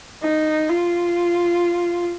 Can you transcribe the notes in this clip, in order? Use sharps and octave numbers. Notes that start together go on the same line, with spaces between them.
D#4
F4